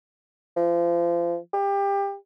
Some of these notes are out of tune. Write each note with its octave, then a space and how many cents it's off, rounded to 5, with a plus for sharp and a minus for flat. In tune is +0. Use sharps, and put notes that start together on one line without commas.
F3 -30
G4 +25